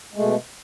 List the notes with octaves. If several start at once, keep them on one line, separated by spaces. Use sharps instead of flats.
B2 G#3 A3